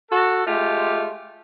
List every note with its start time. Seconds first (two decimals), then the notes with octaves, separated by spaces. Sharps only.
0.11 F#4 A4
0.47 G#3 A3 F4 G4